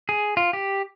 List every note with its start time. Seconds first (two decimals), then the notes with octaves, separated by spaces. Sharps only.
0.09 G#4
0.37 F4
0.53 G4